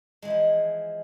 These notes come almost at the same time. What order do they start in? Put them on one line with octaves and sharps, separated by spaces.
G#3 E3 F3 E4